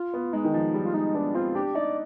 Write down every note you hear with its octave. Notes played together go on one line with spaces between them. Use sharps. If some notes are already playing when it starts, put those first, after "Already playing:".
Already playing: F4
B3
G#3 D#4
D#3
F3
G3
F4
G#3 D#4
B3 D4
C4 F4
D4 G4
D#4 D5